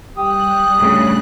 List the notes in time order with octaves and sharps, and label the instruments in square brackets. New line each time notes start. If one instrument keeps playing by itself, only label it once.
[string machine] G3 F#6 [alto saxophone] G4 [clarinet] D#6
[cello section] D2 A2 C#3